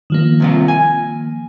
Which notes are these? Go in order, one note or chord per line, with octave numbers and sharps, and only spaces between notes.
D#3 F3 A#3
C2 C3 F4
G#5